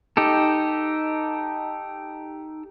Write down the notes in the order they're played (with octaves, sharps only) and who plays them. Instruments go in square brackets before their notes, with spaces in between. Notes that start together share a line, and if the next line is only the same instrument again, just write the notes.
[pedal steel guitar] D#4 G4 A4